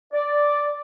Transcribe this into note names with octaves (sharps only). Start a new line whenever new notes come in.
D5